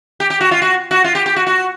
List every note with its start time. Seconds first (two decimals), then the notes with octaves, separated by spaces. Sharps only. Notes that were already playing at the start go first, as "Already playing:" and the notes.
0.20 G4
0.30 G4
0.41 F#4
0.51 F4
0.62 F#4
0.91 F#4
1.04 F4
1.15 G4
1.26 G4
1.36 F#4
1.47 F#4